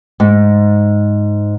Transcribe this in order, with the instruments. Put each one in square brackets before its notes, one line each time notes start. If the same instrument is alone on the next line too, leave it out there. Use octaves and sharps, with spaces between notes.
[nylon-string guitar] G#2